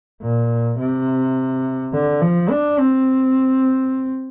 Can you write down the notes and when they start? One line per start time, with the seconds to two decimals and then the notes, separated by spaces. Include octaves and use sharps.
0.22 A#2
0.79 C3
1.94 D3
2.22 F3
2.50 D4
2.79 C4